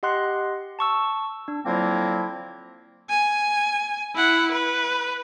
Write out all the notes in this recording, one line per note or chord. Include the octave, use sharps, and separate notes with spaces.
G4 D#5 F#5 C6 F#6
A5 C#6 E6
D4
D3 F3 F#3 A#3 C4 E4
G#5
E4 F#5
B4